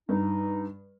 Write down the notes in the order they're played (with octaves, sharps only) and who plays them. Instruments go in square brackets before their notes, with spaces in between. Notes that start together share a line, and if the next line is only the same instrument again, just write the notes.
[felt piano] G2 [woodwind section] D#4